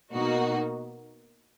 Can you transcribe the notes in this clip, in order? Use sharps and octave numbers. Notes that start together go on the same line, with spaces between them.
B2 A#3 D#4 F#4